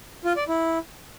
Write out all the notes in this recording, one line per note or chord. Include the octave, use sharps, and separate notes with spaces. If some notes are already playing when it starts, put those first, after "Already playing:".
F4
D5
E4